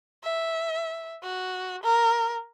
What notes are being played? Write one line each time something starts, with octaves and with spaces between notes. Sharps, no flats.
E5
F#4
A#4